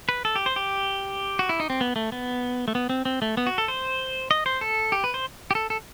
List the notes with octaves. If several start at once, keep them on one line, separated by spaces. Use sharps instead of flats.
B4
A4
G4
C5
G4
F#4
E4
D#4
C4
B3
A3
B3
A3
B3
C4
C4
A3
B3
F#4
A4
C5
D#5
C5
A4
G4
B4
C5
G4
A4
A4